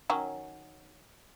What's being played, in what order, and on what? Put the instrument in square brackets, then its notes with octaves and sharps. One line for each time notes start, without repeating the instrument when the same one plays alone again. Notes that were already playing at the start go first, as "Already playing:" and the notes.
[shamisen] D#3 F#3 C#4